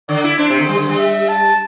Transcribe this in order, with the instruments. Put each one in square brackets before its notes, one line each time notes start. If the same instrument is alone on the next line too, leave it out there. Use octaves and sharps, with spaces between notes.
[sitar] D3 [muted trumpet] D5
[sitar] E4
[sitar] D4 [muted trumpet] C5
[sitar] C3
D3
G3
D3
G3
[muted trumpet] E5
A5